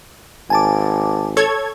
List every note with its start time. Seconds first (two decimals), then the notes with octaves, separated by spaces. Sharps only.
0.50 G#1 G#5 A5 D6
1.37 A4 C#5 G#6